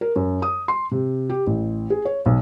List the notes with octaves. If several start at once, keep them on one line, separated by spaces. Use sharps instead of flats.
A#4
F#2
D#6
C6
C3
G4
A1
G#4
C#5
B1